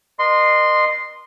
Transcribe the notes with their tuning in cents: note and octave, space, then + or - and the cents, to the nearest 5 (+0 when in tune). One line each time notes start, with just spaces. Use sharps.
A#4 +45 D#5 -30 C6 -5